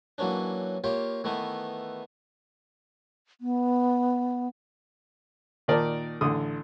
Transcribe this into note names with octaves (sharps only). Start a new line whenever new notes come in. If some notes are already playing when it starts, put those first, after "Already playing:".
E3 F#3 A#3 C#4 D4
A#3 F4 G4 C#5
D#3 E3 A3 B3 E4
B3
A#2 D#3 A#4 D5 A5
A1 D3 A4 D#6